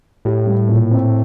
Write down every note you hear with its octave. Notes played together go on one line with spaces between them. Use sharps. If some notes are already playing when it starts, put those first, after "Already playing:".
A2 G4
G3
A#2
C4